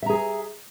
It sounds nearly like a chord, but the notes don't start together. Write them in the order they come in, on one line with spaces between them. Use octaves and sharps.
E5 A#5 G#4